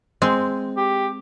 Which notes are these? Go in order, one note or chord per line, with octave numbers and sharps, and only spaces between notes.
G#3 C4
G4